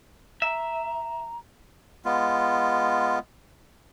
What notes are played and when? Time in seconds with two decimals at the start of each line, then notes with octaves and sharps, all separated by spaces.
0.42 E5 A#5
2.05 G#3 B3 F4